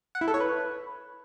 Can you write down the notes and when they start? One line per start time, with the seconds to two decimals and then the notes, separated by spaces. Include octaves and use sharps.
0.15 F#5
0.21 E4
0.28 A4
0.34 C#5
0.40 B4